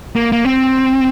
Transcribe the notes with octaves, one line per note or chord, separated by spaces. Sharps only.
A#3
A#3
C4